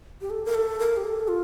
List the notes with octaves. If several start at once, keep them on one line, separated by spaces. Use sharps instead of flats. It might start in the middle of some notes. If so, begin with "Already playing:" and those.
G4
A4
A#4
A4
A#4
G4
A4
F4